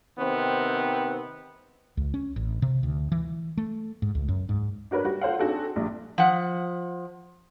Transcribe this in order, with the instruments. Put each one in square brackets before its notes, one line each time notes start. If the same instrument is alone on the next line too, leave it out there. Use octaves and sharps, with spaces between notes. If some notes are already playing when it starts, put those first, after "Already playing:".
[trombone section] C3 D#3 B3 C4
[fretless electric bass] C#2
C#4
A1
C3
D2
E3
A3
G#2
C#2
F#2
G#2
[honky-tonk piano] D4 F#4 A#4 B4 C#5
G3 F#4
F4 A4 C5 C#5 F5 F#5
C4 D4 D#4 F#4 G#4 A4
A#1 G2
[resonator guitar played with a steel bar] F3 F#5